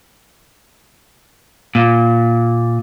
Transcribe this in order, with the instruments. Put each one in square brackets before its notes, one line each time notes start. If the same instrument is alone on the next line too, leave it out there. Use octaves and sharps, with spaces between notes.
[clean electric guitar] A#2